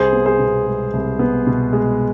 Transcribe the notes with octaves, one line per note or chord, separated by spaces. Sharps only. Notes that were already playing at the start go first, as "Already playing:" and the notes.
Already playing: C2 G#4 C5
B3
G#4 C5
B2
G#3
C2
B3
B2
G#3